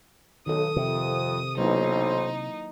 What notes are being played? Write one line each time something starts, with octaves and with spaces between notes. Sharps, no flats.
B1 D#3 A4 D#6
F2 C3
B1 F#3 A#3 D#4 E4 C5